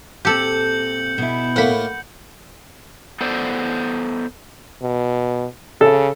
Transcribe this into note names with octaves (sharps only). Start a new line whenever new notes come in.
A#2 C4 G4 A4 G6 C#7 F#7
B2 E4
A2 A3 A#3 F#5 B5
B3 A4 C5 D5
B2
C#3 A4